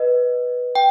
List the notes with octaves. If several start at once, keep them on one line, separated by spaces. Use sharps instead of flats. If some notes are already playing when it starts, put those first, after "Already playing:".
Already playing: B4 D#5
G5